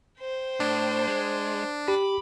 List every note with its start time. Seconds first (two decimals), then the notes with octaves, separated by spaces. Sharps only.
0.20 C5 G5
0.60 A2 D4
1.07 G#3
1.88 G4 B5 D6